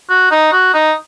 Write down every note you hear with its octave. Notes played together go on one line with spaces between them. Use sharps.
F#4
D#4
F#4
D#4